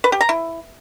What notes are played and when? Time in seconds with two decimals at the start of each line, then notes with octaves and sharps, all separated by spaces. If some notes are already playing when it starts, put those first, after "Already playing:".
0.04 B4
0.12 G4
0.21 A#5
0.29 E4